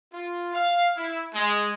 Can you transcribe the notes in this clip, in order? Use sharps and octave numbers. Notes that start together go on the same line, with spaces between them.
F4
F5
E4
G#3